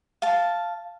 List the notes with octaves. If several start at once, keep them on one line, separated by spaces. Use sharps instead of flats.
F5 A5